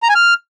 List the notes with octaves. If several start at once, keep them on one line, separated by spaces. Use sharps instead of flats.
A#5
G#5
F6